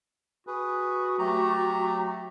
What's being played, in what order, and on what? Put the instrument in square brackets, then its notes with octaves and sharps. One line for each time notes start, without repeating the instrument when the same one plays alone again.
[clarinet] F#4 [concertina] G#4 B4
[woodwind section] F#3 A3 [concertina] G4 A#5